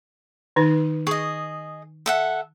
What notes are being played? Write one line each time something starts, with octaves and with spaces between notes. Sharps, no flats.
D#3 D#4 B4
G#4 D#5 C#6
A4 E5 F#5